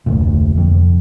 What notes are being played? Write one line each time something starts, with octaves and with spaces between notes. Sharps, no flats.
F1 D2 A#2
F2